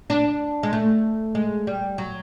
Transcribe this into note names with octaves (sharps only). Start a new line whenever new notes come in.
D4
G#3
A3
G#3
G3
F#3